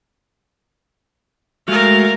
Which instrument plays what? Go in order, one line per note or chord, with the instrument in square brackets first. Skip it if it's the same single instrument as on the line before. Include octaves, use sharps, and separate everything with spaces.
[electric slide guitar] G#3 A3 F#4 [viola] A#4 F5